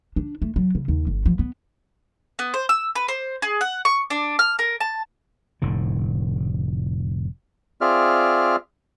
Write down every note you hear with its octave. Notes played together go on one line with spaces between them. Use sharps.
D4
A3
F#3
C#3
D#2
G1
F3
B3
B3
C5
E6
B4
C5
G#4
F#5
C#6
D4
F6
A#4
A5
F1 A2 D3
C4 F4 G#4 D5 E5 F6